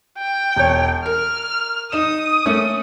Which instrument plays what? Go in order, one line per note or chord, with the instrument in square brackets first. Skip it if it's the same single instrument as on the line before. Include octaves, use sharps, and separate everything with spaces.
[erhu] G5
[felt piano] E1 C#5
[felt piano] A#4 [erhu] F6
[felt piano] D#4 D#5 E7 [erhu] D#6
[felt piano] A3 A#3 C#4